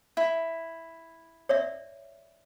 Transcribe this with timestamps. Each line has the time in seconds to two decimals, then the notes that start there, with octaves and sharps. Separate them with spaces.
0.17 E4
1.49 C#5 D5 E5